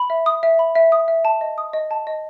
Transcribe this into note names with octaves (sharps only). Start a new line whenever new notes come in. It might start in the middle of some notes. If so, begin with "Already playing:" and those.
Already playing: B5
E5
D#6
E5
B5
E5
D#6
E5
A5
D#5
D#6
D#5
A5
D#5